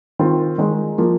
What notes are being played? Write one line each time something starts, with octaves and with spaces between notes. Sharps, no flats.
D#3 C4 F4
D#3 G#3 D#4
F3 A#3